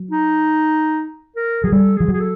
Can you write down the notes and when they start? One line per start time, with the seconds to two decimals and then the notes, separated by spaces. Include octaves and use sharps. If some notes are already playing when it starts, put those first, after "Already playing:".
Already playing: F#3
0.11 D#4
1.36 A#4
1.63 F#3 G#4
1.72 G3 A4
1.96 F3 G#4
2.08 F#3 G#4
2.20 A4